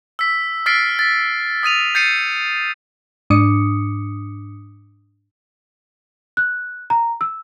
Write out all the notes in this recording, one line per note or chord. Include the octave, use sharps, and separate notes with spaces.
E6 B6
E6 F6 A6 B6 C7 D7
A6 B6
D#6 A6 D#7 F7
G6 A6 C7 C#7 D#7
G#2 D4 D6 D#6 C#7
F#6
A#5
E6